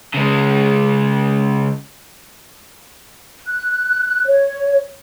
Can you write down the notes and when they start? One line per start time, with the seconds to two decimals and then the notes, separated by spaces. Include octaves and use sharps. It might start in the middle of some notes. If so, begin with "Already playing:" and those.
0.14 C#3 G#3
3.47 F#6
4.26 C#5